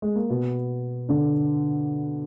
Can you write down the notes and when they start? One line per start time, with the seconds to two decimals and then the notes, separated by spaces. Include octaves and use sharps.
0.02 G#3
0.15 A#3
0.30 B2 B3
1.09 D3 D4